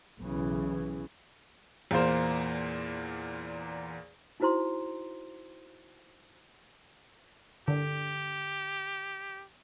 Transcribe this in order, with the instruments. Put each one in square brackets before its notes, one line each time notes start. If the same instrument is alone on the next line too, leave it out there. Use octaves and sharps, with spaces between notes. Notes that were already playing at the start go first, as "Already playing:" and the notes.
[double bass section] B1 C#3 E3
[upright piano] E2 A#2 A#3 C5
[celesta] D#4 E4 F#4 C5 A#5 C6
[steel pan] D3 [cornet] G4